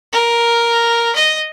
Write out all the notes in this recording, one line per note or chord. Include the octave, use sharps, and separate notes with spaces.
A#4
D#5